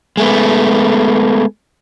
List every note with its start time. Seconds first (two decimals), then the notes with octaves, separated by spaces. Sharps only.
0.17 G#3 A3 B3